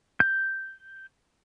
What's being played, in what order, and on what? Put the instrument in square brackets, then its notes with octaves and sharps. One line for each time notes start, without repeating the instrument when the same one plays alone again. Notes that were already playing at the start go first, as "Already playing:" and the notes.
[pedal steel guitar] G6